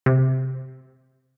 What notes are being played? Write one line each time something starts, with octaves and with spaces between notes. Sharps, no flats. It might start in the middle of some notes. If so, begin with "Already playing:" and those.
C3